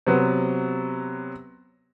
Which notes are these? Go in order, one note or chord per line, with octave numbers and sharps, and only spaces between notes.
C3 F#3 B3